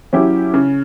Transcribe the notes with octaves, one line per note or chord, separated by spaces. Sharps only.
F#3 C#4 E4 G4
C#3